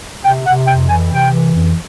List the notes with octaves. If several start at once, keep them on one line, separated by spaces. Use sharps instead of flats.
C3 G5
C3 F#5
F2 G5
E3 G#5
C3 G5
E3
F2